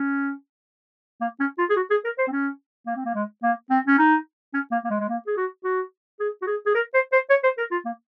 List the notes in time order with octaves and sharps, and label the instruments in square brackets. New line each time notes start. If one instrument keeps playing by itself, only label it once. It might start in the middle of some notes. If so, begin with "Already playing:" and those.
Already playing: [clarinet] C#4
A#3
C#4
F4
G#4
F#4
G#4
A#4
C5
C4
C#4
A#3
C4
A#3
G#3
A#3
C4
C#4
D#4
C#4
A#3
A#3
G#3
G#3
A#3
G#4
F#4
F#4
G#4
F#4
G#4
G#4
A#4
C5
C5
C#5
C5
A#4
F4
A#3